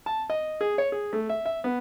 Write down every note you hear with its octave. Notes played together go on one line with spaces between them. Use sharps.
A5
D#5
G#4
C#5
G#4
A3
E5
E5
B3